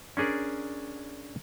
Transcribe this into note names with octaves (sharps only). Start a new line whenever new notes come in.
C#4 D4 G#4 A#4 D5